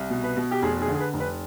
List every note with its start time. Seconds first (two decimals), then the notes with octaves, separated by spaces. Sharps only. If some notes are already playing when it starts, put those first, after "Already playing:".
Already playing: C2
0.10 B2
0.23 B4
0.37 B2
0.51 G4
0.62 F1 G#4
0.81 G#4
0.88 D3
0.94 G#4
1.00 B4
1.13 F1
1.20 B4